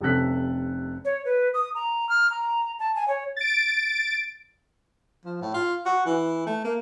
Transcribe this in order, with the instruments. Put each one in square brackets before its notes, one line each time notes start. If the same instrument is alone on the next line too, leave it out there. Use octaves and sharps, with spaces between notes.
[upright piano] F1 C3 C#4 A4 F#6 B6
[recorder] C#5
B4
D#6
A#5
F6
A#5
A5
G#5
C#5
[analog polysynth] A6 D7
[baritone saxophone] F3
A2
F4
F#4
E3
A3
A#3